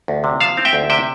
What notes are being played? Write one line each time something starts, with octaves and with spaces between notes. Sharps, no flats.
D2
C3
F3 F5 A5
C4
E5 G5
D2
C3 E5 G5